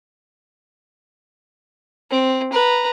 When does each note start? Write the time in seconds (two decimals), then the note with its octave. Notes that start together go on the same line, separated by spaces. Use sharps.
2.10 C4
2.53 B4 A#5